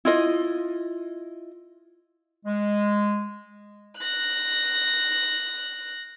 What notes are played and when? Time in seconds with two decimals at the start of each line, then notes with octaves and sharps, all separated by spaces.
0.05 E4 F4 D#5
2.46 G#3
3.98 F#6 A#6